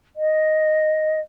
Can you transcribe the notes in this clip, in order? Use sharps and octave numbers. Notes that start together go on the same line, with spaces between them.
D#5